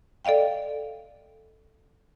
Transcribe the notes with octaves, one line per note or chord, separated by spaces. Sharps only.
A4 D5 D#5 F5 G5